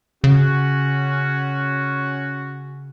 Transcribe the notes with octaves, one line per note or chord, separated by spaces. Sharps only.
C#3 C#4 F#4